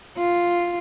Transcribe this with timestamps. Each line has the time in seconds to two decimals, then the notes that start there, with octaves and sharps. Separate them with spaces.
0.18 F4